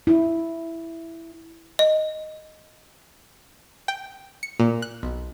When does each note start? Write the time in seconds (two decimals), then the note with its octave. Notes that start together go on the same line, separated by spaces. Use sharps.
0.07 E4
1.79 D#5
3.88 G5
4.43 C#7
4.60 A#2
4.82 F#6
5.03 B1